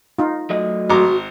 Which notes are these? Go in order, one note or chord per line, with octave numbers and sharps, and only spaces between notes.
D#4 F4
F#3 A3 D#5
G#1 F#4 A#5 D6